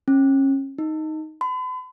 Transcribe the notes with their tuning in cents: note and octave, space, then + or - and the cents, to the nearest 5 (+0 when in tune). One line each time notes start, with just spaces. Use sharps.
C#4 -30
D#4 +5
B5 +45